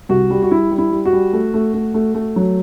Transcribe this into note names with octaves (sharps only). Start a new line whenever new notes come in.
C2 F#4
G3
F#4
G3 E4
G3
E4
G3
F#4
G3
A3
A3
A3
A3
A3
F#3